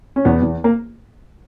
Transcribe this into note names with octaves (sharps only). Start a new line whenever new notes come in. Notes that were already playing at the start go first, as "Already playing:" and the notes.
C#4
E2 B3
E2
A#3